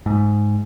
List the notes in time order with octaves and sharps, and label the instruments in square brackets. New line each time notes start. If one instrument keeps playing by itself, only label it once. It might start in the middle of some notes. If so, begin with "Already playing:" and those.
[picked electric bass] G#2